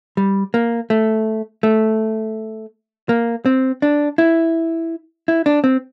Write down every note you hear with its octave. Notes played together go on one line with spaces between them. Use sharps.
G3
A#3
A3
A3
A#3
C4
D4
E4
E4
D4
C4